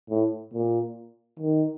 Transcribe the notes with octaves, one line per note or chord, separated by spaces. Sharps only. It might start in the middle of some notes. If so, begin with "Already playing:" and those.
A2
A#2
D#3